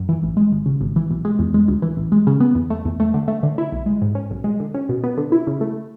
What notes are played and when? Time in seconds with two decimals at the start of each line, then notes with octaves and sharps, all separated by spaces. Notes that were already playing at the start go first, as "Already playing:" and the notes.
Already playing: F#2
0.09 E3
0.23 A1
0.37 G#3
0.52 G#1
0.66 C#3
0.80 G#1
0.96 E3
1.10 B1
1.25 G#3
1.39 E2
1.54 G#3
1.68 D2
1.82 E3
1.97 A1
2.12 G#3
2.27 C#3
2.40 B3
2.55 E2
2.70 A3
2.85 E2
3.00 A3
3.14 D3
3.28 A3
3.43 D3
3.58 E4
3.72 B1
3.86 G#3
4.02 G#2
4.15 C#4
4.31 B1
4.44 G#3
4.60 D3
4.74 C#4
4.89 B2
5.04 B3
5.18 D3
5.32 E4
5.47 C#3
5.61 A3